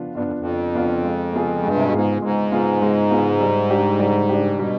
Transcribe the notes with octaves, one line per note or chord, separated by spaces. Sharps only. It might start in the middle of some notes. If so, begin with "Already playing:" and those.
Already playing: F3 B3 D4 F4
G2 B3 D4 F4
F2
F2
F3
B3 D4 F4
G#3
B3 F4 G#4
G2 G#3
C3
B2
G#2 B3 F4 G#4
G#2 G#3
B3 F4 G#4
G#3
B3 F4 G#4
G3
D4 G4
G3
D4 G4
B2 G3